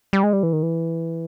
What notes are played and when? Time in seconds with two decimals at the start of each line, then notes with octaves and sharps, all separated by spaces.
0.13 G3
0.23 G#3
0.33 G3
0.43 E3
0.53 D#3
0.63 E3